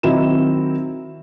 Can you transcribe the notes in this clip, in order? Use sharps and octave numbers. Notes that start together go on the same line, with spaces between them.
D#3 F#3 C4 D#4 E4 E7